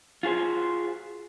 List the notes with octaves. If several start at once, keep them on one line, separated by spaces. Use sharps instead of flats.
F4 F#4 G#4 C5